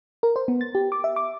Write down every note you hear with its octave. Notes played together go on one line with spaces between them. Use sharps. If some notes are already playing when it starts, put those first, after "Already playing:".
A#4
C5
B3
A6
G4
D6
E5
D6